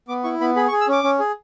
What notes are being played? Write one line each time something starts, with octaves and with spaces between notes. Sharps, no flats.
B3 D6
E4 C#6
B3 B5
G#4 B5
C#6
G#4
E6
C#4 D6
C#4
G#4